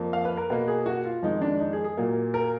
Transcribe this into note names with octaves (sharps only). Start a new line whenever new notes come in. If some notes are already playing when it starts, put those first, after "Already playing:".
Already playing: F2 F3 A#3
F5
B4
A#4
B2 A#3 B4
G#4
F#4
F4
F2 D#3 G#3 D#4
D4
D#4
G#4
G#4
A#2 F#3 A#3
A#4